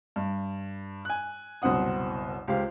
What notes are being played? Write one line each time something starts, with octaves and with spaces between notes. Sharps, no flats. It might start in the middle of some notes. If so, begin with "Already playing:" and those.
G2
G#5 F#6
F#1 C2 B2 C4 F#5 D#6
C#2 G4 C5 F5